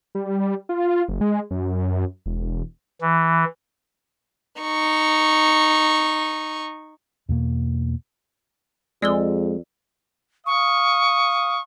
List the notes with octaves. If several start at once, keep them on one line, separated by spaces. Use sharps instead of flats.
G3
F4
F#1
G#3
F#2
E1
E3
D#4 C#6
E2 B2 A#3
F2 G#3 D5 E6 G7
F5 C#6 D#6